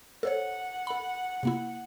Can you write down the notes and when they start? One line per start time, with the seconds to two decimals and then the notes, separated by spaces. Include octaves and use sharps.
0.23 A4 C5 C#5 F#5
0.87 A4 B5
1.43 C3 A#3 E4